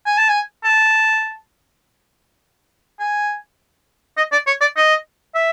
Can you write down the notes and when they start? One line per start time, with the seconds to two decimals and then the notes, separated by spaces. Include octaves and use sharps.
0.06 G#5
0.18 A5
0.29 G#5
0.64 A5
2.99 G#5
4.17 D#5
4.32 D5
4.47 C#5
4.61 D5
4.76 D#5
5.34 E5